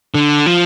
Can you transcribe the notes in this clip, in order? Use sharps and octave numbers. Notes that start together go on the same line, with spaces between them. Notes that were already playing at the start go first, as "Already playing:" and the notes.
D3
F3